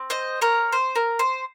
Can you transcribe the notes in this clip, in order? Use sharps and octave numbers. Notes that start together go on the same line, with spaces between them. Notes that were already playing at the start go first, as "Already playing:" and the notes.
Already playing: C4
C5 D#5
A#4 C#5
C5
A#4
C5